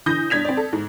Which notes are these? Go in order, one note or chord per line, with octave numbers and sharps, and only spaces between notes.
D3 E3 D#6 G6 A#6
G2 D5 G#6 B6 F7
C4 D5
A4
G#2